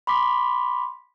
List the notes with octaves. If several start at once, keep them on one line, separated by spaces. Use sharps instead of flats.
B5 C6 D6 B6